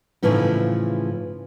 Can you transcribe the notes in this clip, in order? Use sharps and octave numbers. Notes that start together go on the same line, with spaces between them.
A2 C#3 E3 F3 B3 D#4